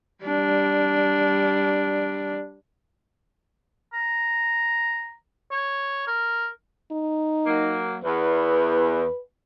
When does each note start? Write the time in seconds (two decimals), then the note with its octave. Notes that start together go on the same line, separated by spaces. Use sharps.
0.24 G3 D4
3.94 A#5
5.52 C#5
6.07 A#4
6.92 D#4
7.47 F#3 A#3
8.04 E2 B4